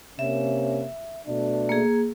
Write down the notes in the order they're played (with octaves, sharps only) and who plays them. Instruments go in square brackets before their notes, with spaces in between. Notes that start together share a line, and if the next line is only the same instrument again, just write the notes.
[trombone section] C3 A#3 C#4 [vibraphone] E5
[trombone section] B2 A3 D4
[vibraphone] A#3 G#4